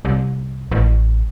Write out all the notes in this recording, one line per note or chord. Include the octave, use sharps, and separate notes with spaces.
C2
A1